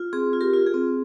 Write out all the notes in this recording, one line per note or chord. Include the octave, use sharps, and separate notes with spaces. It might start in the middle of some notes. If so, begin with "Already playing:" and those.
Already playing: F4
C4 G#4
F4
G4 A#4
F4
G#4
C4